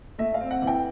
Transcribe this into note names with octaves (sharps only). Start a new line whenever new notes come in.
A3 E5
F5
C4
F#5
E3
G5